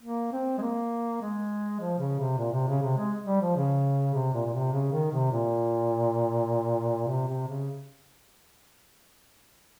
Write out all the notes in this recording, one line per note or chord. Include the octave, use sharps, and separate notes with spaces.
A#3
C4
G#3
A#3
G#3
F3
C#3
C3
A#2
C3
C#3
C3
G#3
G3
F3
C#3
C3
A#2
A#2
C3
C#3
D#3
C3
A#2
C3
C3
C#3